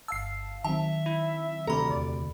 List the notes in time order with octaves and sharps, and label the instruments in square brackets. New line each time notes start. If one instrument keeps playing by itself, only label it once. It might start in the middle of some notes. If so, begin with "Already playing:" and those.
[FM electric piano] G1 F5 A5 [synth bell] E6 C7
[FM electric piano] D#3 F#3 C4 [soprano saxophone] E5 [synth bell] A5
[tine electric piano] E4
[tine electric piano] D2 C3 [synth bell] A4 B5 [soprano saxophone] A#5
[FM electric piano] E2 [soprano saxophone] D5